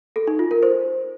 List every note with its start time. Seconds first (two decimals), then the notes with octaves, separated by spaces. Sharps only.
0.16 A4
0.27 D#4
0.39 F4
0.51 A#4
0.63 C5